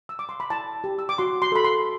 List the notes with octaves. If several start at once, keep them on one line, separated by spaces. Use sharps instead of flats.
E6
D6
C6
B5
E4 A5
G4
E6
D6
F#4 C6
C6
A4 B5
C6